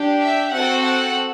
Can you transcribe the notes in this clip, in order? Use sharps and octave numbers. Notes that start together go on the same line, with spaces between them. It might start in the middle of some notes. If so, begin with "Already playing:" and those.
Already playing: D4 G4
E5
C4 F#4 A4 F#5
F#5